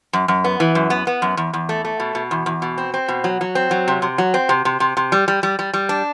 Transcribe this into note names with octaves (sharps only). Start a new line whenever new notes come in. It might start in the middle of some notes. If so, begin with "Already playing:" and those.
F#2
F#2
B3
E3
F#2
B3
B3
F#2
E2
E2
A3
A3
B2
B2
E2
E2
B2
C4
C4
B2
F#3
F#3
C4
F#3
C3
C3
F#3
C4
C3
C3
C3
C3
G3
G3
G3
G3
G3
D4